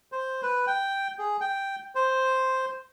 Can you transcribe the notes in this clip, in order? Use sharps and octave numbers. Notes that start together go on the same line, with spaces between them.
C5
B4
G5
G#4
G5
C5